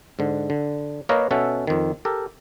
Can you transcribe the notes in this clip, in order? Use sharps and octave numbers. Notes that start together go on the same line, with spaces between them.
G#2 D3
D3
A#3 A#4 B4 C#5 D#5 F5
B2 C#4 A4 E5 F#5
F2 D#3
G4 A4 A#4